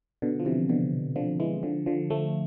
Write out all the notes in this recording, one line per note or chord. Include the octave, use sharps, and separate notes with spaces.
B2 D3
F3
C3 E3
B2 D3
D3 F3
E3 G#3
D3 F3
D3 F3
F3 A3